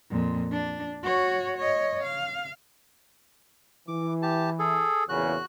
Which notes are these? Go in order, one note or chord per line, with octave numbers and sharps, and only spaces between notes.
F2 A#2
D4
F#4 C#5
C#5 D#5
F5
E3 D6
G4 A5
G#4 A4
E2 A#2 C#3 F#4 F#6